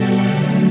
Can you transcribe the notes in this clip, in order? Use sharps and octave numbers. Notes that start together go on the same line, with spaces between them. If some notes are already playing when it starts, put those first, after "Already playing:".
Already playing: B2 G3 F#4 G4 A4
D3 F#3 A3